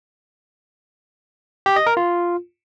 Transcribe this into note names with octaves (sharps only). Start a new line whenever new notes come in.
G4
D#5
A#4
F4